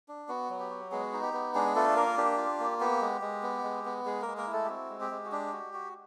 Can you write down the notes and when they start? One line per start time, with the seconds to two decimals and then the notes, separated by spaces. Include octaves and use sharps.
0.08 D4
0.29 B3 F#4
0.50 F#3
0.60 G4
0.70 F#4
0.91 G#3 B3 G#4
1.13 D#4
1.23 G4
1.33 B3
1.55 G#3 D4 G#4
1.76 A3 F4 A4
1.96 A#3 A#4
2.18 D4 G4
2.38 F4
2.60 A#3
2.80 B3 G4
3.02 G#3
3.22 G#3
3.43 B3
3.64 G#3
3.86 B3
4.05 G#3 G#4
4.22 A#3 A#4
4.27 G#3
4.37 A#3 A#4
4.47 E4
4.53 A3 A4
4.65 G4
4.69 C4 F#4
4.90 G#3
5.01 G4
5.11 G#3
5.25 F#4
5.32 D4 G4
5.53 F#4
5.74 F#4